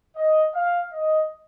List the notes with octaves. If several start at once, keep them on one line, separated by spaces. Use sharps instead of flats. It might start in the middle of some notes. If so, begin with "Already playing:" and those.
D#5
F5
D#5